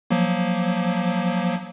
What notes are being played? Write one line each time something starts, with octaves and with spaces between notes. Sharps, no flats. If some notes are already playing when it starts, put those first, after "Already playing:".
F3 F#3 A#3